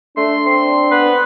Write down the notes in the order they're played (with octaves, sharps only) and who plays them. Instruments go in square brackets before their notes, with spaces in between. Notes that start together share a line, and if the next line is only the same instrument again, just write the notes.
[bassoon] A3 [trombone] D4 [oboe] C6
[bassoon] C4 [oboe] C6
[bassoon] B3 [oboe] B4